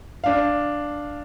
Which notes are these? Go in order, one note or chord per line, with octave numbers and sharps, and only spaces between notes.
D4 F5